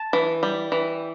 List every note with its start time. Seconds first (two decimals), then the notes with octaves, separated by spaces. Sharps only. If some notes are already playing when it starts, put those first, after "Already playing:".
Already playing: A5
0.13 E3
0.43 G3
0.72 E3